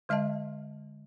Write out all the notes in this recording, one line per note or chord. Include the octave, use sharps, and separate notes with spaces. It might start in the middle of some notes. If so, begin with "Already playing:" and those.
D3 G#3 D#5 E5 A5